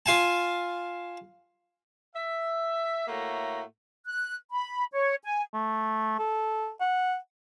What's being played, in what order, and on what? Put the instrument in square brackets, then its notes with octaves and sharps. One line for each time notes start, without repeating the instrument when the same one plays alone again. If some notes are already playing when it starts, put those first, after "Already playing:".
[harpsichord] F4 F5 G#5 A5
[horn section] E5
A2 A3 A#3 F#4 A#5
[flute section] F#6
B5
C#5
G#5
[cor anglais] A3
A4
F#5